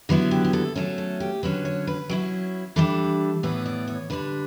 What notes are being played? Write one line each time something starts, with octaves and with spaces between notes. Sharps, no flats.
D3 F#3 B3 E4 B4
G4
G4
A4
F#3 A3 C#4 A4
A4
G4
D3 F#3 C#4 B4
C#5
B4
F#3 C#4 E4
E3 G3 D4 A4
A2 E3 B3 B4
D5
C#5
D3 G3 D4 B4